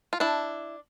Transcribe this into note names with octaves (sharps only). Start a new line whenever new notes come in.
F4
D4 E4